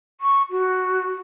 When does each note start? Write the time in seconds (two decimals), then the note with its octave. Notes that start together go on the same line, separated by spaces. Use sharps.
0.20 C#6
0.50 F#4